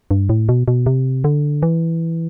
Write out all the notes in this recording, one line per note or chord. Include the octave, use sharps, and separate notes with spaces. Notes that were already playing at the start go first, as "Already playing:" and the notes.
G2
A2
B2
B2
C3
D3
E3